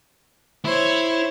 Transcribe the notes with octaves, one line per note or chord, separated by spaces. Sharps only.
E4 C5 C#5